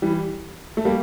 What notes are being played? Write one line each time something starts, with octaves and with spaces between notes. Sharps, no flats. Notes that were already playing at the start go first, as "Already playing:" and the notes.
E3 G3
A3
G3 A#3